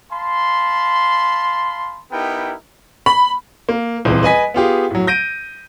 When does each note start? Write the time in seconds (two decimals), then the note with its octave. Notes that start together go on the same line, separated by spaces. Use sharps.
0.11 F5 A5 B5 C6
2.11 B3 D#4 E4 G4 A#4 G5
3.06 B5
3.69 A#3
4.05 D#1 C#2 E3 C4
4.23 B4 D#5 G#5 B6
4.54 B3 F4 G4 G#4
4.91 A2 F#3
5.07 G6 A#6 D7 D#7